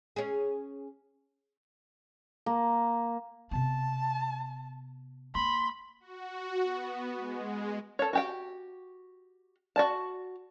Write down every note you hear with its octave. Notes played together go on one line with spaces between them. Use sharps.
C#4 G#4
A#3
C3 B3 A5
A#3 B5 C6
F#4
B3
G#3
A4 C#5
F#4 G4 G5
F#4 D5 A5